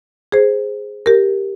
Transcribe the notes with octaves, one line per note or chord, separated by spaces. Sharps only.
G#4 C5
G4 A#4